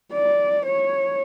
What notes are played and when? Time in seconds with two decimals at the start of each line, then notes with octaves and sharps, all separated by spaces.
0.13 D5
0.65 C#5